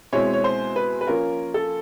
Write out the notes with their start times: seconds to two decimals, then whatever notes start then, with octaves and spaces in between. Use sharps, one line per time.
0.13 B2 G#3 C4 E4 C#5
0.33 C#5
0.44 C5
0.76 B4
1.01 B4
1.07 F3 A#3 C#4 F4 A#4
1.54 A4